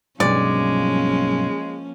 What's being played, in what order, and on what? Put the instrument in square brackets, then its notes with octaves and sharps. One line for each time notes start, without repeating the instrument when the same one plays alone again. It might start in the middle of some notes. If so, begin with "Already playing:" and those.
[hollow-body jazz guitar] B1 G2 [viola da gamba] F3 A#3 C#4 [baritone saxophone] G#3 [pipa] D5